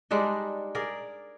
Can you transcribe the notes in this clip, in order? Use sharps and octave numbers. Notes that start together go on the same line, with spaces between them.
G3 G#3 D4 D#4
G#4 A#4 D5